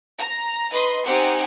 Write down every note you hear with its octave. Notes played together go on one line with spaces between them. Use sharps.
A#5
D#4 B4 D#5 C6
C4 D#4 G4 F#5 G#5